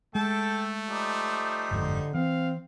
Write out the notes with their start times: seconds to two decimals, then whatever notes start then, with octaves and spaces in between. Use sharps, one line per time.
0.15 G#3 A3 A4 G5 A5
0.88 F3 G3 D#4
1.71 G1 F2 G#2 D3
2.14 E3 C4 F5